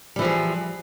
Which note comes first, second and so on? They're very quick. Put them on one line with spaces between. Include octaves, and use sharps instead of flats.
G3 E3 F3 G#4